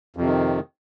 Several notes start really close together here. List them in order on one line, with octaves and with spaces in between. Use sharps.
F2 C3 D#3